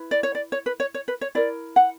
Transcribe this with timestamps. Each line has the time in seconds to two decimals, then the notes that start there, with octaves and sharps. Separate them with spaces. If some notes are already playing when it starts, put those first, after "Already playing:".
Already playing: E4 B4
0.11 D5
0.23 C#5
0.35 D5
0.52 C#5
0.66 B4
0.80 C#5
0.94 C#5
1.08 B4
1.21 C#5
1.35 E4 A#4 D5
1.76 F#5